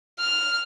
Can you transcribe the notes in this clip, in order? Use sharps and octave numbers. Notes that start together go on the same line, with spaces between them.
F6